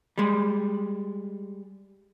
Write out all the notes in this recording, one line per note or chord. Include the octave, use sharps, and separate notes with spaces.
G3 G#3